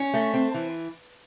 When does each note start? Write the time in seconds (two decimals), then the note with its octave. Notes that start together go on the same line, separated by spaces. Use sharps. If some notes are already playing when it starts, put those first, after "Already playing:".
Already playing: C#4
0.14 A3
0.34 C4
0.54 E3